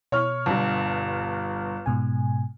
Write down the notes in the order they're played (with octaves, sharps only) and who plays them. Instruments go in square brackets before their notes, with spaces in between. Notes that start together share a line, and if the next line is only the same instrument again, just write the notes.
[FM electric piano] B2 [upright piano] C#5 C#6 F6
[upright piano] G1 G2
[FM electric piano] G#2 B2 G#5